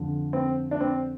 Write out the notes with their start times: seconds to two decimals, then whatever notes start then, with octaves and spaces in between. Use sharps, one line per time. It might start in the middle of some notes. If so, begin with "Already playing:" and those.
Already playing: F2 D3
0.33 C4
0.71 D4
0.80 C4